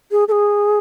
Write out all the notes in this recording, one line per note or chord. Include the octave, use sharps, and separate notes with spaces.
G#4
A4
G#4